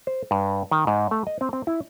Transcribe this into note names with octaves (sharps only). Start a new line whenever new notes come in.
C5
G2
D#3
G#2
A3
D#5
C4
C4
E4